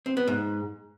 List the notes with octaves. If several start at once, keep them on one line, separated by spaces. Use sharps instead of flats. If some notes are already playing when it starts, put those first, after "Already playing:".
C4
B3
G#2